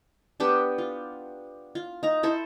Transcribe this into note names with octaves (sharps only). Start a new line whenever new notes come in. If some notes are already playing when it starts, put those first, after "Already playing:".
B3 D4 G4
F4
F4
D#4 A#5
E4 A4 C5